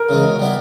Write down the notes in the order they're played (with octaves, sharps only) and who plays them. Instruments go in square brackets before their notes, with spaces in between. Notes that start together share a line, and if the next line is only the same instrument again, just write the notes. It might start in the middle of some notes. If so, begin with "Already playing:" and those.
Already playing: [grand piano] A#4
[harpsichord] C#3 E3 G#3
B2
G3 B3 E4